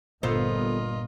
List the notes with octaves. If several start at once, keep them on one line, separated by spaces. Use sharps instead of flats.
G1 A#2 B3 F4 A4 A#4 C5 D#5